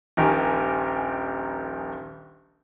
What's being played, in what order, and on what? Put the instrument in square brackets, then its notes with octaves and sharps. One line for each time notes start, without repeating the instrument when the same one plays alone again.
[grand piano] D#1 A#1 D#3 G4 A#4 G#5